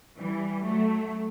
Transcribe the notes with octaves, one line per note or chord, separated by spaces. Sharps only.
E3 G3
F#3 A3